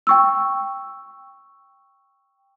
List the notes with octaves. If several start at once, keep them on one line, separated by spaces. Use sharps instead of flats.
G5 C#6 E6